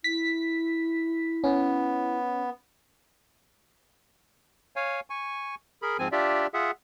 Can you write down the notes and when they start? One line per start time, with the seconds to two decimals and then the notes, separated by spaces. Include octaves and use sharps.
0.04 E4 B6
1.44 B3 C#4
4.76 C#5 F5 G#5
5.10 G#5 C#6
5.82 G#4 A#4 B5
5.99 G#2 F3 C4 G#5
6.12 D4 F4 G4 D5 E5
6.54 F4 G#4 E5 F#5